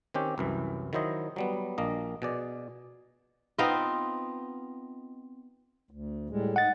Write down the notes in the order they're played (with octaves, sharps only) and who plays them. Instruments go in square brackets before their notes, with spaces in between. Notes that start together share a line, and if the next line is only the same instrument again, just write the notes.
[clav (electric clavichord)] D#3 C4 C#4 G4
C2 F#2 E3
D#3 F#3 E4 C5 D#5
F#3 G3 B3
A#1 A#3 D#5
B2 G#4 D5
[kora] B3 C4 D#4 F4
[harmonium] D2
A2 G3 G#3
[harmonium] G#2 D#5 [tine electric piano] F#5 A6